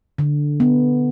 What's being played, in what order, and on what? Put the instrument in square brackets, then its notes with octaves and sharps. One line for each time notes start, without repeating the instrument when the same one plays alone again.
[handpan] D3
B3